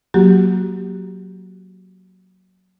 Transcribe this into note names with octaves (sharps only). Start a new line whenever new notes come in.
F#3 A#3 F#4 G4